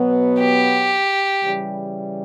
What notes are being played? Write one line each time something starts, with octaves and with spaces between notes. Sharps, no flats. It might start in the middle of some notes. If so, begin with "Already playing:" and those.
Already playing: B2 F#3 B3
G4
C#3 E3 G3